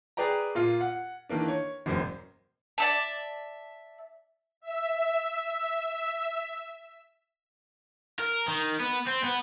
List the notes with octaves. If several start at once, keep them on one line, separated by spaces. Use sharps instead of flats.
G#4 B4 D5 G5 A#5
A#2 A#3 F4
F#5
D#3 E3 A#3 D4
C#5
E1 F#2 A#3 C5
D5 E5 A5
E5
E5
A#4
D#3
B3
C4
B3